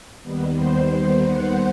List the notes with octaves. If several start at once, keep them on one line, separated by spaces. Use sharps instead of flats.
D#2 D#3 G3 B3
C5
F#5